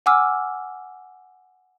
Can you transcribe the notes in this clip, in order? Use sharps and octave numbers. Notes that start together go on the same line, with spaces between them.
F#5 G#5 D6 E6 F6